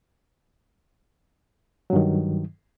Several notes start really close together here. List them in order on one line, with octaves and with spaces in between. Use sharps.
F#3 G2 D#3